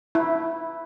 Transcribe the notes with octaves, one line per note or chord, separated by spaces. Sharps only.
E4